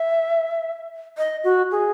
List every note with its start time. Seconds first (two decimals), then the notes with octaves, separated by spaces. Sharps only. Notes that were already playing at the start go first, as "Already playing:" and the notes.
Already playing: E5
1.18 D#5
1.44 F#4
1.71 G#4